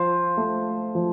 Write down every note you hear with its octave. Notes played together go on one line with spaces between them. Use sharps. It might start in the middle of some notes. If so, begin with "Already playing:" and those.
Already playing: F3 F4 C5 F5
A3
F3